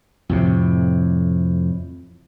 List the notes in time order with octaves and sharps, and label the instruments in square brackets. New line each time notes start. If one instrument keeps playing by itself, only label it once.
[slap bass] F2 A2 C3